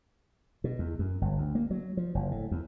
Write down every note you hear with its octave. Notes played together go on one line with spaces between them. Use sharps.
B2
E2
F#2
G1
D2
A#3
F#3
F3
F#1
A2
E2